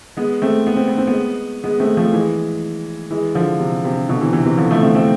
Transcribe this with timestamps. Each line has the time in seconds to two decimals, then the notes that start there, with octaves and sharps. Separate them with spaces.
0.17 G#3 B3
0.42 A3 C4
0.67 B3
0.76 C4
0.88 B3
0.98 C4
1.07 G#3 B3
1.64 G#3 B3
1.80 A3 C4
1.97 F3 A3
2.13 E3 G#3
3.11 E3 G#3
3.35 D3 F3
3.60 C3
3.85 C3
4.09 B2 D3
4.21 C3 E3
4.33 C3 E3
4.45 C3 E3
4.58 D3 F3
4.71 F3 A3
4.82 A3 C4
4.95 A3 C4